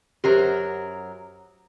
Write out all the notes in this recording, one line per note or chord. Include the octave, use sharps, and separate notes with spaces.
F#2 F#3 G4 A#4 C5